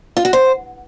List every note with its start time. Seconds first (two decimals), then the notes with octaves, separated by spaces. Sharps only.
0.17 F4
0.25 F#4
0.33 C5